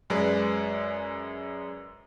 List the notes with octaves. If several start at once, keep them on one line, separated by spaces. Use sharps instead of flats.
F#2 G#3 B4 D5